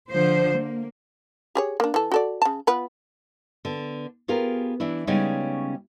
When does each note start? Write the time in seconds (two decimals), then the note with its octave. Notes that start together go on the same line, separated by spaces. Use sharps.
0.10 D3 F3 C5
0.58 A#3
1.55 G4 G#4 C#5
1.80 A#3 D4
1.94 E3 A4
2.12 F#4 A4 D5
2.42 C#3 A5
2.67 B3 F4 B4
3.65 D3 B3
4.28 B3 F4 G4 G#4 A#4
4.80 E3 D4 E4
5.07 C#3 G3 G#3 B3 C#4 D#4